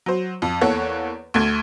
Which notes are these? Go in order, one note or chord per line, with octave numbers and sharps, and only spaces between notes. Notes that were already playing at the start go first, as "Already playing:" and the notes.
F#3 C5
F2
E2 A#3 A4 C#5 F#5
D2 A3 G#6